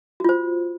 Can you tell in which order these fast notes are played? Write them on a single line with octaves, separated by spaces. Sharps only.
F#4 F4 C5